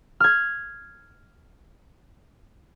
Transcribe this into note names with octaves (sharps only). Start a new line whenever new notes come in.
F6 G#6